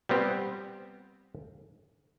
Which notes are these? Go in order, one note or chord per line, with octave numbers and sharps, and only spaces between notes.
G3 B3 C4 G4